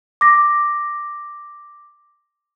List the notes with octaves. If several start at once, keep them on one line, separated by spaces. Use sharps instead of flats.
D6 A#6